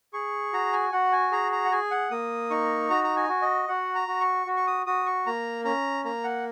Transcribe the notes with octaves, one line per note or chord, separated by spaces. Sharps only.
G#4 C#6
F#4 A#5
G#5
F#4 F#5
G#5
G#4 A#5
A#5
F#5
G#4 G#5
F#5
A#3 D#6
D#4 C#6
F#4 A#5
A#5
G#5
F#4
D#5
F#4 F#5
A#5
F#4
C#6
F#4
C#6
D#6
F#4 D#6
C#6
A#3 A#5
C#4 A#5
A#3 A#5
F#5